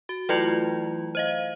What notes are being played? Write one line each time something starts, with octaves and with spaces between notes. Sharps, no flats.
F#4
E3 F#3 A3 E4 F4
C5 D#5 F5